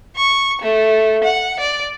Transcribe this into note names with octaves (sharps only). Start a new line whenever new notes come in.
C#6
A3
F#5
D5